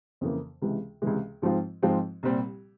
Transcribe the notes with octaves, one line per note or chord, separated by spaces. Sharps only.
F2 C#3 E3 A#3
C#2 C3 E3 G#3
C#2 C3 E3 G#3
G#2 F3 G#3 C4 F4
G#2 F3 G#3 C4 F4
C2 A#2 G3 C4